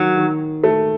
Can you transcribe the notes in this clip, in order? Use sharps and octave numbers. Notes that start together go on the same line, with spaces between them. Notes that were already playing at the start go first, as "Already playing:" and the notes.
Already playing: D#3 F#3
D#3
A3